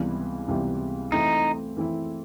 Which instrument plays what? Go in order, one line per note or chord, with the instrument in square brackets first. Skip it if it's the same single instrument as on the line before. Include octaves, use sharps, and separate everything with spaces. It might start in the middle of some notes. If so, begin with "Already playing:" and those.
Already playing: [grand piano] C#2 C3 E3 G3 B3
C#2 C3 E3 G3 B3
[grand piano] E3 A3 C4 E4 [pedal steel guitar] D#4
[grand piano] E3 A3 C4 E4